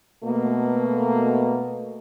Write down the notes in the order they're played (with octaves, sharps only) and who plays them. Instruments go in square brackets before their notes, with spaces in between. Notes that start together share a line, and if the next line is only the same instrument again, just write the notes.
[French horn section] B2 A3 A#3